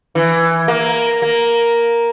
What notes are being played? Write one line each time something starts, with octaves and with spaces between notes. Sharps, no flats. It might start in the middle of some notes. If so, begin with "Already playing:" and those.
E3
A#3
A#3